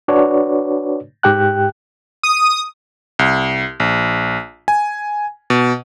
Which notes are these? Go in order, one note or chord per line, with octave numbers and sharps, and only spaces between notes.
D4 F#4 B4 C#5 D5
G#2 G4 G5 F#6
D#6
C2
A#1
G#5
B2